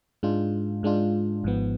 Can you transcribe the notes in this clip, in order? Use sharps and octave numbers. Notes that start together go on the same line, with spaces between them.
G#2 G#3 D4 F4
G#2 G#3 D4 F4
G#1 G#2 F3 B3